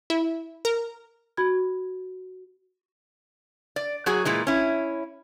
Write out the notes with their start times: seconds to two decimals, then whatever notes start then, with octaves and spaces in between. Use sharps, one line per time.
0.10 E4
0.65 A#4
1.37 F#4 B5 G#6
3.76 D5
4.06 F#3 F#4 G#4
4.25 A#2 E3 G#3
4.47 C#4 E4